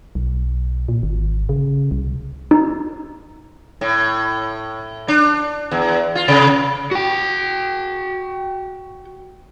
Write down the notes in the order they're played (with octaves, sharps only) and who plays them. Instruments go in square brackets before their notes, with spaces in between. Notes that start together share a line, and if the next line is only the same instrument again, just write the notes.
[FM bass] B1
A#2
G#1
C#3
C2
[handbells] D#4
[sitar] A2
D4
E2
F4
C3
[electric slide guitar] F#4 G5